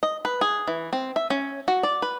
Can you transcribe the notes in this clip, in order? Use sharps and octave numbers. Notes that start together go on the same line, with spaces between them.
D#5
B4
G#4
E3
C4
E5
C#4
F#4
D5
B4